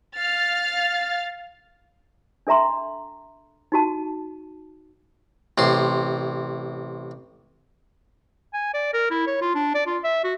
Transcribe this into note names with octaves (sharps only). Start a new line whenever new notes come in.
F5 F6 A6
D4 A4 E5 A#5 C6
D#4 F#4 A5
A1 C3 C6
G#5
D5
A#4
E4
C#5
F4
D4
D5
F4
E5
F#4